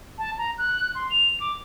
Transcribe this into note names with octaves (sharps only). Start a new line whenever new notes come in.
A5
A#5
F#6
C6
F7
D6